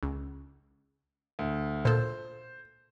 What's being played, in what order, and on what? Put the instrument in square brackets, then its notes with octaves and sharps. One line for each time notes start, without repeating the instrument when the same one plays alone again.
[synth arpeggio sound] C#2
[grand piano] D2
[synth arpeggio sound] A#2 A4 [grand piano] C5